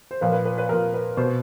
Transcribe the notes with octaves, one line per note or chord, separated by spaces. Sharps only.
C5
A#2 F3 B4
B4
B4
B4
A#2 F3 A#4
B4
B2 C5